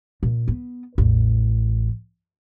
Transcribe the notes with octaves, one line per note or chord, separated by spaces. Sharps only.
A#2
B3
A1 E2